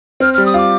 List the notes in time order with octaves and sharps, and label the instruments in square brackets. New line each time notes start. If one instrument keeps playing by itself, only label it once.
[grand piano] C4 [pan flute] F6
[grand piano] G3 [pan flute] F6
[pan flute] D#6
[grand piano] F4 [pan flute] D6